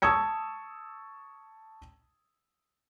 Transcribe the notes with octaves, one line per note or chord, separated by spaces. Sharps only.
A5 C#6 D#6 E6 G#6 C#7